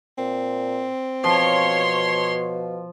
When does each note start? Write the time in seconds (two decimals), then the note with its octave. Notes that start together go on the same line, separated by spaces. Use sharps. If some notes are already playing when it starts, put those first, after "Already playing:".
0.18 A#2 C4
1.24 B2 F3 C#5 C6